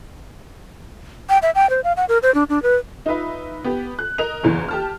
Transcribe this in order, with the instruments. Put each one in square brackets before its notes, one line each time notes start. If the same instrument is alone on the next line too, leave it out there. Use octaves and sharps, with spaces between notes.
[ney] G5
E5
G5
C5
F5
F#5
A#4
C5
D4
D4
B4
[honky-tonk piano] D#4 F4 B4 E5
B3 G4
F#6
A#4 D#5 F7
F#1 E2 E3
G4 A5 F6